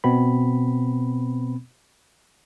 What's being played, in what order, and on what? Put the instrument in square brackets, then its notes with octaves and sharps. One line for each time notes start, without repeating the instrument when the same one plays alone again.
[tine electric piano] B2 B3 C4 B5